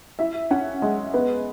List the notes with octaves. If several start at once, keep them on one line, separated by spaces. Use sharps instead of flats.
E4 E5
C#4 F#5
G#3
B3 B4